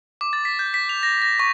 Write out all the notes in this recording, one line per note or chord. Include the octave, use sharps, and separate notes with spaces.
D6
A6
B6
G6
B6
F7
A#6
A#6
C#6